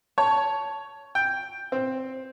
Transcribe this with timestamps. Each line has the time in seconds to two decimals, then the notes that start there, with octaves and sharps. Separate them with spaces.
0.18 C#5 A5
1.15 G5
1.72 C4